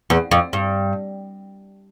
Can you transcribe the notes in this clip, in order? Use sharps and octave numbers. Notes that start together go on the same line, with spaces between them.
E2
F2
G2